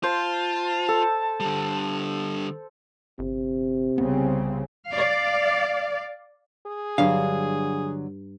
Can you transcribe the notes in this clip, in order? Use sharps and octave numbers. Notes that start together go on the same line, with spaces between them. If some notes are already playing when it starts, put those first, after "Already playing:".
F4 C5 A5
A4
D3 G3
G1 C3
C2 C#3 B3 C4
D5 F5
G#4
G2 D3 F#3 F5